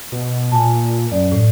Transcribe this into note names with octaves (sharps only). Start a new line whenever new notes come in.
B2
A#2 G#5 A5
F#2 D5
A2